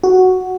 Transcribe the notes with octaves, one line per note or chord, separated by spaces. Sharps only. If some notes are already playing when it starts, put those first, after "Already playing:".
F#4